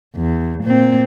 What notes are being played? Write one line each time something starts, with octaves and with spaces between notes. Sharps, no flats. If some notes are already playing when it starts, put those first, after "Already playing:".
E2
A#2 C4